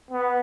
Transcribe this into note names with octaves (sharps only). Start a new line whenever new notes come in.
B3